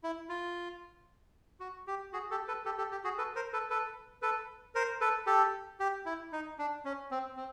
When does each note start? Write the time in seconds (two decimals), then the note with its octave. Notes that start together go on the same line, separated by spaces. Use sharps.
0.04 E4
0.29 F4
1.60 F#4
1.87 G4
2.13 F#4 G#4
2.31 G4 A4
2.48 A4 B4
2.65 G4 A4
2.78 G4 A4
2.92 G4
3.04 F#4 G#4
3.18 A4 B4
3.35 A#4 C5
3.53 A4 B4
3.70 A4 B4
4.22 A4 B4
4.75 A#4 C5
5.01 A4 B4
5.27 G4 A4
5.80 G4
6.06 E4
6.33 D#4
6.58 D4
6.85 C#4
7.11 C4
7.37 C4